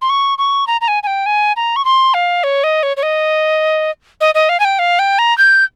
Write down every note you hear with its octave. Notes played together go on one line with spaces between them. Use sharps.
C6
C#6
C#6
A#5
A#5
G#5
G#5
G5
G#5
A#5
C#6
C6
F5
C#5
D#5
C#5
C#5
D#5
D#5
D#5
F5
G#5
G5
F5
G5
A#5
G6